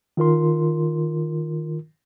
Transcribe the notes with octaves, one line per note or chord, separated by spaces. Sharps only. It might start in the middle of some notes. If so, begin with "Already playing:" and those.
D#3 F4 A#4 C6